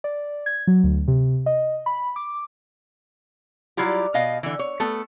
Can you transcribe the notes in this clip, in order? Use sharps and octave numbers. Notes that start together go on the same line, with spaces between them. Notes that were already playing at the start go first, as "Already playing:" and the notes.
D5
G#6
F#3
D2
C3
D#5
B5
D6
F#3 G3 E4 F4 G4
B2 D#5 F5
D3 E3
C#5
A3 B3 A4